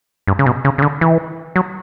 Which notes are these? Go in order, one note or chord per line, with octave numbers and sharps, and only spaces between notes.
G2
C#3
B2
C#3
C#3
D3
E3
F#3